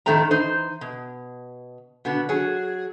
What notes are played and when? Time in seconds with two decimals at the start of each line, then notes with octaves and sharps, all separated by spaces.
0.06 F2 A2 D#3 A3 C4 A#5
0.31 E3 D#4 C5
0.81 B2
2.05 B2 D3 B3
2.29 F#3 G#4